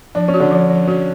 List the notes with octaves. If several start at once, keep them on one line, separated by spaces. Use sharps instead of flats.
F3 D4
C#4
F#4
D3 D4
F3
F3
C#4 F#4